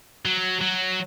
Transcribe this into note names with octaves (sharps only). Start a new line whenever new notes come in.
F#3
F#3